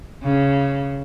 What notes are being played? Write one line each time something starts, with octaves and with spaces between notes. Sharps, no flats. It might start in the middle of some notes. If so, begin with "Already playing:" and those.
C#3